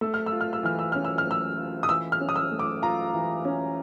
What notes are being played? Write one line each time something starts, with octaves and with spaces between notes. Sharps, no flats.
A3 E6
F6
E6
F4
F6
E6
E3 F6
E6
C#4 F6
E6
F6
A3 E6
F4
D#6
E3 E6
F6
C#4
D#6
E6
A3
D6
F4 A#5
E3
C#4